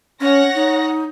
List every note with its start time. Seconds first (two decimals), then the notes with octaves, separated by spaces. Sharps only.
0.20 C#4 C#5 F#5 A#6
0.55 D#4